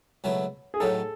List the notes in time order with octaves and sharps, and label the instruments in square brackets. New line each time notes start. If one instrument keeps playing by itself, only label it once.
[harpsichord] C#2 B2 F#3 A3 E4
[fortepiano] G#4
[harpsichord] A2 F#3 A3 D#4 [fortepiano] A4